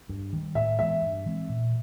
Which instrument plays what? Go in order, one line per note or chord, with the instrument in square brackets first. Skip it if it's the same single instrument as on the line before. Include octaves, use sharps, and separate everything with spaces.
[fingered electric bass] G2
D#3 G3
[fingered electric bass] A2 [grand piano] E5
[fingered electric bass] E3 G#3 B3 [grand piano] E5
[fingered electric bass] G2
E3 G#3 C4
A#2